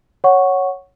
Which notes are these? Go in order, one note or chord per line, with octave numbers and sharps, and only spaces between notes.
C#5 F#5 C#6